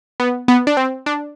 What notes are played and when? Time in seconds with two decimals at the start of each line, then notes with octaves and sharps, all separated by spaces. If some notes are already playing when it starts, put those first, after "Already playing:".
0.20 B3
0.48 B3
0.67 D4
0.77 C4
1.06 D4